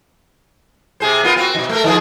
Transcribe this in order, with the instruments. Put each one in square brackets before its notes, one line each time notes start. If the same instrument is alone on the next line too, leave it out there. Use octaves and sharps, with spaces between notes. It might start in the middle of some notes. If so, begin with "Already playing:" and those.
[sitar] C3 G#4 C5
B3 F4 A#4
C4 F#4
B2 D#3
A3 A#4
D#3 F3 G#4